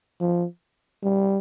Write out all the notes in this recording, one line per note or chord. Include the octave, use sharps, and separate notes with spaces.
F3
G3